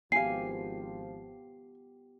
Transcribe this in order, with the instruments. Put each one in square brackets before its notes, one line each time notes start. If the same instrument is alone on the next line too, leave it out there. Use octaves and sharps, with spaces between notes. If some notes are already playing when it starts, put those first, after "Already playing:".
[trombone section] G#1 F3 [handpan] B3 F4 G4 [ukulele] F5 G#5 [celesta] C7